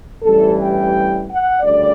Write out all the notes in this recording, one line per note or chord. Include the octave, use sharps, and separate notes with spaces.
A1 G2 E3 G3 A4
G5
F#5
D2 C#3 G3 D5